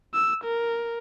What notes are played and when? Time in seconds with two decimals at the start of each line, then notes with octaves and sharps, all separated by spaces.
0.14 E6
0.44 A#4